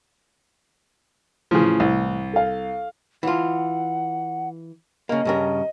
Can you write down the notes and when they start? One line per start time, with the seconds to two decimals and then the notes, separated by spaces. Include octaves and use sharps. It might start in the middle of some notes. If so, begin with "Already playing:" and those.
1.51 A2 C#3 E3 F3
1.80 C2
2.33 A4 F5
3.23 E3 F4 F#5
5.09 C#3 A#3 D#5
5.25 G2 C#3 A#4